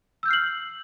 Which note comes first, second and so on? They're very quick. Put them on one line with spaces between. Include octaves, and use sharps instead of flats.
E6 G6 F6 C7 F#7